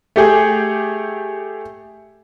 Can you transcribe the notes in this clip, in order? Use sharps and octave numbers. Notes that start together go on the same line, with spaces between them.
A3 G4 G#4